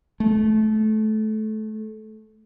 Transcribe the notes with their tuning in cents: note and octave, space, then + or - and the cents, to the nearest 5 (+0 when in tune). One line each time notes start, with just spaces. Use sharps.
A3 -20